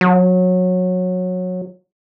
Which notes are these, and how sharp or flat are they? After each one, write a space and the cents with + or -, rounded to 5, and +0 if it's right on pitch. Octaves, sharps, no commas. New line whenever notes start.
F#3 -20